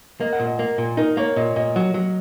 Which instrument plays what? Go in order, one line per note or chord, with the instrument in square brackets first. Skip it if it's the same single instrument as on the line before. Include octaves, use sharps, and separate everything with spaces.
[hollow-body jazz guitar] A#3 [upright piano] D#5
[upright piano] F#5
[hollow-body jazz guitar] A#2
[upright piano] D#5
[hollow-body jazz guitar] A#3
A#2
[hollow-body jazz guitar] D#4 [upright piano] A#4
[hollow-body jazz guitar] A#3 [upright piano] C#5
[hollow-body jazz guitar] A#2 [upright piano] D#5
[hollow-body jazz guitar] A#2 [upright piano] D#5
[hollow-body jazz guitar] F#3
F#3